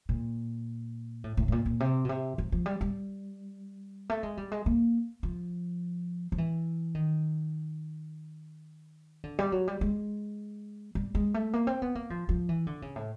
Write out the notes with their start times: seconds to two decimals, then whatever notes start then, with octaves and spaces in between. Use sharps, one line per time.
0.09 A#2
1.24 A2
1.37 A2
1.48 A2
1.52 A#2
1.66 A#2
1.80 C3
2.05 B2
2.09 C3
2.38 F3
2.52 F3
2.66 G3
2.81 G3
4.10 A3
4.23 G#3
4.37 G3
4.52 G#3
4.66 A#3
5.23 F3
6.32 F3
6.38 E3
6.95 D#3
9.24 D3
9.39 G3
9.52 F#3
9.68 G3
9.81 G#3
10.95 G3
11.15 G#3
11.34 A3
11.53 A#3
11.67 C4
11.82 B3
11.95 A#3
12.10 F3
12.29 F3
12.49 E3
12.67 D3
12.82 C#3
12.96 A2